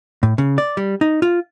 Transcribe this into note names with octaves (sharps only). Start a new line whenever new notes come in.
A2
C#3
D5
G3
D#4
F4